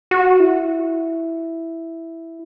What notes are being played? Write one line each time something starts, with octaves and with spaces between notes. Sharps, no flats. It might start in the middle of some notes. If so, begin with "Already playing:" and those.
F#4
E4